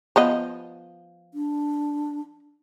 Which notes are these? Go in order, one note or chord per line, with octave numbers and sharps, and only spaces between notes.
F3 B3 D#5
D4